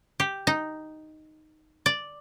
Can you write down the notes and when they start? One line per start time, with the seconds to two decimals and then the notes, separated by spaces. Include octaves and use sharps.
0.20 G4
0.47 D#4
1.86 D5